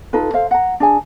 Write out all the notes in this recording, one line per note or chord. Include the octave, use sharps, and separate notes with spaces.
D#4 F4 A4 B4
C5 E5 F5
F#5 A#5
D4 G#4 G#5